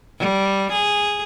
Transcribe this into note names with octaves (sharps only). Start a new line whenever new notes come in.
G3
G#4